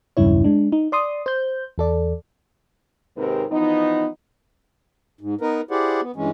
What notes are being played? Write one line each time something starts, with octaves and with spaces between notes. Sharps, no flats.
B1 E2 G2 C#3 E4 C#5
G#3 D4
D#4
D5 C6 D#6
C5 G6
E2 A4 D5
D#2 G#2 C3 C4 A#4 B4
E3 F3 B3 D#4
G#2
B3 D#4 A#4 B4
E4 G4 G#4 C5 D5 F#5
B3
G2 E3 G#3 C#4